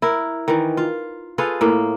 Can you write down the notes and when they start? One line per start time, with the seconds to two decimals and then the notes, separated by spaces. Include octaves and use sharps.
0.02 E4 A#4
0.48 D#3 E3
0.77 F4
1.38 F4 G#4 A4 B4
1.61 A2 A#3